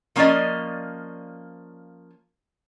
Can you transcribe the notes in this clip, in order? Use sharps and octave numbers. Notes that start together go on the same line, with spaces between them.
F3 A#3 C#4 A4 D5 D#5